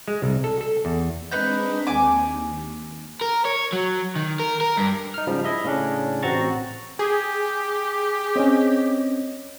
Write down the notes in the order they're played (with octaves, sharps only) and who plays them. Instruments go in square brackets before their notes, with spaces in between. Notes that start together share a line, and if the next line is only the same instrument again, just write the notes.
[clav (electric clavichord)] G#3
C2
A4
A4
E2
[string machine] G#3 C4 D4 [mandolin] D#4 B4 G6
[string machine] D#2 [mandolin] G#5 D6
[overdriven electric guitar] A#4
C#5
F#3
D#3
A#4
A#4
G2
[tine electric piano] D#4 F6
G#2 C#3 F3 G3
E4 D#5 E5
A2 C#3 C#4 D4
A1 C4 F#4 A#5 C#6 A6
[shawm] G4 [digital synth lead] G#4
[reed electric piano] C4 C#4 [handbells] C#5 D#5